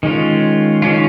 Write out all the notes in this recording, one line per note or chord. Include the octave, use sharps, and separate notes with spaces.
D#3 G#3 C#4 F4
D#3 G#3 C#4 F4